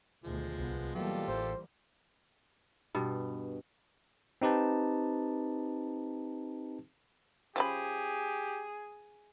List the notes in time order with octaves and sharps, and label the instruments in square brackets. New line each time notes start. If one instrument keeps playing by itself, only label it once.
[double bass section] D2 B2 D#3 [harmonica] F3 G#3
[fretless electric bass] C2 [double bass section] B3
[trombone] B2 [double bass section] E3 G3 A#3 [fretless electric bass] F#3 [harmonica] F4 G4 A4
[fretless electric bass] A1 [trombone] C5
[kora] G2 B2
[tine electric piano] C4 D#4 G4 B4 A5
[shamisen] F3 C#4 B5 [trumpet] G4 [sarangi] G#4